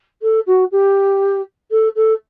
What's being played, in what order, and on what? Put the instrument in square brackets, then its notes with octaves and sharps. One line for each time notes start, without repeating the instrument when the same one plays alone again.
[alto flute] A4
F#4
G4
A4
A4